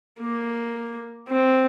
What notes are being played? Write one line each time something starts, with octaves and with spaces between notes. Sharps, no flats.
A#3
C4